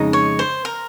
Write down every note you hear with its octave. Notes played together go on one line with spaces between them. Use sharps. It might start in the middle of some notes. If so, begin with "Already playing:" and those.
Already playing: F2 C#3 G#3 D#4
C#5
C5
A#4